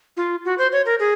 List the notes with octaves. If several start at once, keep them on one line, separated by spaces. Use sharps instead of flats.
F4
F#4
C5
C#5
A#4
G#4